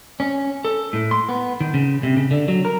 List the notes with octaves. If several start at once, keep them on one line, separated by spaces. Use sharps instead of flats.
C#4
A4
A2
C6
B3
D#3
C#3
C3
C#3
D3
F#3
A#4